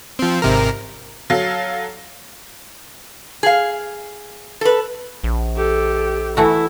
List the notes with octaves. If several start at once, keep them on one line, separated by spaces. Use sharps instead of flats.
F3 C4
G#1 C3 A#4
F#3 A4 F5
G#4 F5
A4 B4
A#1
G4 A4
E3 A3 E4 F#4